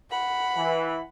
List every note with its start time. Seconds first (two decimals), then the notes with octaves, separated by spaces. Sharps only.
0.11 F#5 B5
0.57 E3